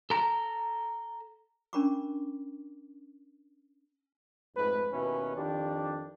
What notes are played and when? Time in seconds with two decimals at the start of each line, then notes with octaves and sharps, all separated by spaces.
0.10 A4 A#5
1.73 C#4 D4 A#4 B5 C#6 D6
4.56 F2 G#2 A3 B4
4.92 D#2 B2 C#4 E4 B4
5.36 F2 D#3 D4 G4